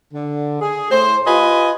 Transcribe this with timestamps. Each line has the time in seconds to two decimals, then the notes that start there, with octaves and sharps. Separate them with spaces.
0.12 D3
0.61 G#4
0.90 A2 C5
1.26 F4 G4 B4 D#5 G#5